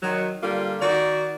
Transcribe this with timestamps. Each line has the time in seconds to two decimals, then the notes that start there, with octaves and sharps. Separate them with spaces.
0.03 D#3 F#3
0.43 D3 G3 A#3 F4
0.82 D#3 F#4 D5